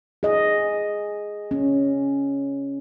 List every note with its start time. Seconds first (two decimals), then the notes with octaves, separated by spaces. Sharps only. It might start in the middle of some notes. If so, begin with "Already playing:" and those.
0.23 G#4 D#5
1.51 C#4